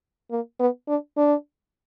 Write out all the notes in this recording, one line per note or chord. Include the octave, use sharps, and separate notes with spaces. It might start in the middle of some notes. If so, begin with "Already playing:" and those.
A#3
B3
D4
D4